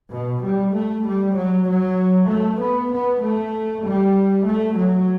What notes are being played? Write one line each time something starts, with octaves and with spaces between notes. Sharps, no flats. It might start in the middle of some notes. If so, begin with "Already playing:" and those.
B2
G3
A3
G3
F#3
F#3
A3
B3
B3
A3
G3
A3
F#3